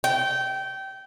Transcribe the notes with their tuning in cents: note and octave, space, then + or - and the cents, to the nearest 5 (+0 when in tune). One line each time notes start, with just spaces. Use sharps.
G5 -20